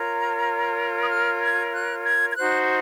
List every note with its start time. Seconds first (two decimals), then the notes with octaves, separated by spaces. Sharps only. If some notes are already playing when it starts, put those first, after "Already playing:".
Already playing: F4 A#4 C#5 A#5
1.03 D#6
1.09 F6
1.42 G#6
1.72 F#6
2.04 G#6
2.31 G#6
2.35 D#4 F#4 C5 F#6